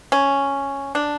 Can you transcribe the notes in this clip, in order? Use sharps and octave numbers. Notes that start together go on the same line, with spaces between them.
C#4
D4